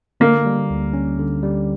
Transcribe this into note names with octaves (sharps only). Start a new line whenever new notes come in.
D3 A#3
G3
D2
C#4
D3
G3